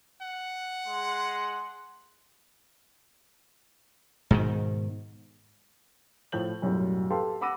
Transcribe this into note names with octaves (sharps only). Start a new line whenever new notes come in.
F#5
G#3 C6
G#2 B2 D#3
A2 F3 G6 F#7
B1 F#2 A2 G3
G4 A4 B4 F5 G5 C6
F#5 B5 D6 E6 A#6 D#7